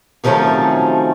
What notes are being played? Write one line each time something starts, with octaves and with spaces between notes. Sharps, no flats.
C3 D#3 F3 F#3 A3 C#4